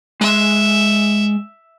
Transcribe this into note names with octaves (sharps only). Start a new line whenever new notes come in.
G#3 E5 C6